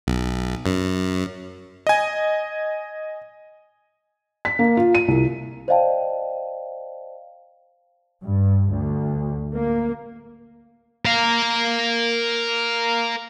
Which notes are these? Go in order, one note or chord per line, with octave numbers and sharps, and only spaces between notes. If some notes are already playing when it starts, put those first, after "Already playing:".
B1
F#2
D#5 G#5
B6
A#3
F4
D#7
C2
C5 D5 D#5 F5 G5 A5
G2
D2
A#3
A#4 F5